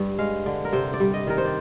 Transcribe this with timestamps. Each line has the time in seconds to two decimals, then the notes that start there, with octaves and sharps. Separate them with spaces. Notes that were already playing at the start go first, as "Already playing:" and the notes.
Already playing: G2
0.18 G#3 F5
0.46 D3
0.65 A#4
0.73 C3 C5
0.94 D5
1.00 G3
1.14 D#5
1.27 D#3 A#4
1.38 C5
1.45 D5